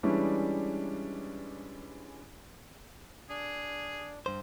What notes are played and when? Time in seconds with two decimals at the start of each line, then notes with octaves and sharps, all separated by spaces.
0.03 E3 G3 G#3 C#4 D4 E4
3.30 D4 G#4
4.26 G2 C5